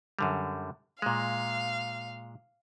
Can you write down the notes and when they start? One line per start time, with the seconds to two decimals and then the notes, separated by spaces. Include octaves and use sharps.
0.19 F#2 D3 G3
1.02 A#2 G#3 F5